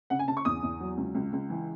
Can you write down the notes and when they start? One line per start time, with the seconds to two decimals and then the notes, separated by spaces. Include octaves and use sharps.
0.10 C#3 F#5
0.19 G#5
0.28 C#3 A5
0.37 C#6
0.45 E2 D#6
0.63 E2
0.80 F#3
0.97 C#2
1.15 C#2
1.33 C#2
1.50 E3